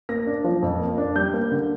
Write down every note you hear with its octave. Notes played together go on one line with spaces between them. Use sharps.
A#3 A#6
D4
F3
F2
A#3
D4
G3 G6
A#3
D3